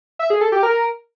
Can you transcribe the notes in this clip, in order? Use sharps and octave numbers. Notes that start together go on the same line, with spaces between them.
E5
G#4
A4
G4
A#4